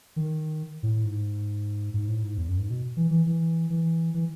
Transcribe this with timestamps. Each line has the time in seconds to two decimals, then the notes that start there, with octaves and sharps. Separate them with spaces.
0.16 D#3
0.83 A2
1.05 G#2
1.94 G#2
2.08 A2
2.23 G#2
2.38 E2
2.48 F#2
2.59 G#2
2.70 B2
2.97 E3
3.11 E3
3.26 E3
3.70 E3
4.14 E3